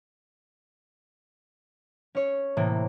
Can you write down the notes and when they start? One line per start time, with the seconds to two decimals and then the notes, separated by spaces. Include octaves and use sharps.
2.15 C#4 C#5
2.57 A2 C3 E3 A#3